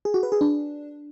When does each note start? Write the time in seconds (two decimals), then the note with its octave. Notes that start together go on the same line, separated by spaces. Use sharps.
0.05 G#4
0.14 F#4
0.23 B4
0.32 G#4
0.41 D4